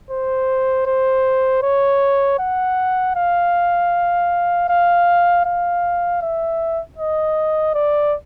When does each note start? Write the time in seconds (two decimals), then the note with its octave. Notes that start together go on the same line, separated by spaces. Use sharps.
0.11 C5
0.86 C5
1.62 C#5
2.39 F#5
3.16 F5
4.69 F5
5.45 F5
6.22 E5
6.98 D#5
7.75 D5